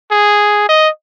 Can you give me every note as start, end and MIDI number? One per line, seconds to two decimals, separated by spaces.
0.11 0.65 68
0.69 0.89 75